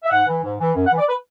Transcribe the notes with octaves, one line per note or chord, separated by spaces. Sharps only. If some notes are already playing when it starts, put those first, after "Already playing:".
E5
G#2 F#5
E3
G#2
E3
F#2
F#5
E3
D5
B4